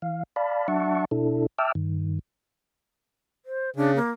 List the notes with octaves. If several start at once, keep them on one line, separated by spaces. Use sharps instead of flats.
E3 F5
D5 F5 A5 B5
F#3 D4 E5 F#5 A5 C#6
B2 D4 E4 A4
E5 G5 A5 D6 E6 F6
G2 D#3
C5
C#3 D4
A#3